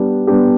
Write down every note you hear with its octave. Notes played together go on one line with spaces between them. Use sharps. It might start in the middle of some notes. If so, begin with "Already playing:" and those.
Already playing: G3 B3 D4 G4
G3 B3 D4 G4